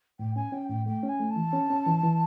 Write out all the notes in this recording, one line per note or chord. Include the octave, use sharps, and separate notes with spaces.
A2 G5
C#4 G#5
C#4 G5
A2 G5
A3 G5
C#4
G#5
A3
A5
E3
C#4
C#4
E3
E3